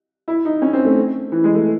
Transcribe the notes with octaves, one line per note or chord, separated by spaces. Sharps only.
E4
D#4
C#4
C4
A3
E3
G#3
A3